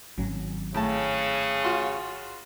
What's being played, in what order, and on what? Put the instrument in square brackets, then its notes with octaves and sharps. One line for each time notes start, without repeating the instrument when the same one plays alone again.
[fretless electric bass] G#1 F#3 C#4
[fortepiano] A2 A5 [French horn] C#3
[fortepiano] F4 F#4 C6